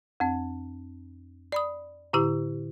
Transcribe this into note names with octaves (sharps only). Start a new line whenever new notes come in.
F2 C4
D5 B5 D#6
A2 D3 E4 G4